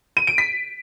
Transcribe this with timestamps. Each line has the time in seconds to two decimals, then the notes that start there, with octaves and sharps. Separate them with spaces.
0.17 D#7
0.27 D7
0.38 B6